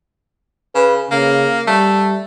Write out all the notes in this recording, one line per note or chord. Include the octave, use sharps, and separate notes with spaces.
C#3 B4
C#3 A#3
G3 A3